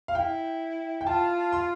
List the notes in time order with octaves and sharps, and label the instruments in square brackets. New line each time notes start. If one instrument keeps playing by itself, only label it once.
[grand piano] F5
[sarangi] E4 [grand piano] G5
[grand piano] G5
[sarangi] F4 [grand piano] A5
[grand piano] C6